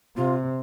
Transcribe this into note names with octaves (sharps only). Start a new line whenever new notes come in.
C3 F4